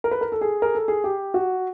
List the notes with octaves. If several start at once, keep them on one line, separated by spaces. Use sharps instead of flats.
A#4
B4
A#4
A4
G#4
A#4
A4
G#4
G4
F#4